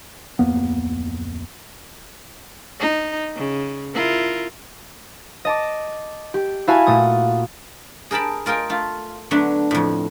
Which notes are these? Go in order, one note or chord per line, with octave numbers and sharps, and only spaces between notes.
D1 F2 A#3 B3
D#4
C#3
E4 F4 A#4
D#5 A5 D6
G4
E4 F#4 E5 F5 G#5 A5
A#2 A3 D#6
G#4 A#4 G5 A5 B5
F4 A#4 D#5 G5 G#5
A3 F4
D3 F#3 A3 B3 D4 F#4
F2 A2